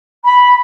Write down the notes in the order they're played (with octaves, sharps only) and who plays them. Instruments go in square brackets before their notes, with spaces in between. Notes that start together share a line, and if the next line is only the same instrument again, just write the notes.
[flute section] B5